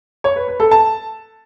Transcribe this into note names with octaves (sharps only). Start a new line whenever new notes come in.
C#5
B4
B4
A4
A5